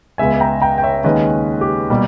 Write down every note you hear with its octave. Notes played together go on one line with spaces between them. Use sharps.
C#2 C#3 G#3 B3 E5 G#5
G5 A#5
G5 A#5
G5
C#5 E5
D#2 D#3 G#3 C#4 B4 D#5
G4
B2 G3 A#3